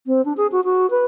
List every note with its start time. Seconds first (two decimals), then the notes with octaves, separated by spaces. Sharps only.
0.06 C4
0.25 D4
0.37 G#4
0.52 F#4
0.64 F#4
0.90 B4